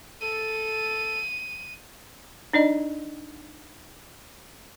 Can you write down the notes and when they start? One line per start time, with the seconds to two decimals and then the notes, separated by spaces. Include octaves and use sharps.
0.21 A4 D#7
2.53 D4 D#4 D5 D#5